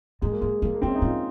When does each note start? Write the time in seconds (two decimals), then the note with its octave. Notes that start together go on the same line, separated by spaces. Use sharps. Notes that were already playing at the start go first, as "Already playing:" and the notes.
0.21 D#3 G#3
0.32 A#3
0.41 F3 G#3
0.62 F3 A#3
0.74 A#3
0.82 D#3 C4
0.88 C#4
0.95 D#4
1.02 F3 F4